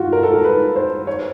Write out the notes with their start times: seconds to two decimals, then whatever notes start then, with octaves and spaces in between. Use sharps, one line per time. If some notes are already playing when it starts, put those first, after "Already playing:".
Already playing: F4 F#4
0.13 A#4
0.23 A4
0.34 A#4
0.44 B4
0.76 C5
1.07 C#5